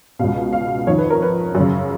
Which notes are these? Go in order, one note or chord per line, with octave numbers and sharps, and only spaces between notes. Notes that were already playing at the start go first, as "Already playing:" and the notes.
C#2 B2 F5
F5
F2 D#3 C#5
B4
A#4
B4
F#2 C#3